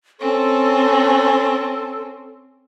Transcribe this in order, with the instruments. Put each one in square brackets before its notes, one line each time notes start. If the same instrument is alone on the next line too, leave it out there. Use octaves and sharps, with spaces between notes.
[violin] C4 C#4 [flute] A4